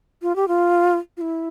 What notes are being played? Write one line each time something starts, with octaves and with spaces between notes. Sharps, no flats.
F4
G4
F4
F4
E4